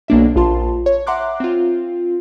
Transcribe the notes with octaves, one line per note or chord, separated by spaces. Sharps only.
B1 A#3 D4 E5
A#1 F4 A5 C6
C#5
E5 F#5 A#5 C6 D6 F#6
C4 F4